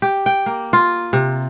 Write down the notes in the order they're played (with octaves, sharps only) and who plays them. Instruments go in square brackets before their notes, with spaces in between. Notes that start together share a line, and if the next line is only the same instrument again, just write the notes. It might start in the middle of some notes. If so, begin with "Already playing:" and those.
[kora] G4
G5
A#3
F4
C3